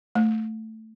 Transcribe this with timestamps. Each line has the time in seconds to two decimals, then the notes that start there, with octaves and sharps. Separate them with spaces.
0.15 A3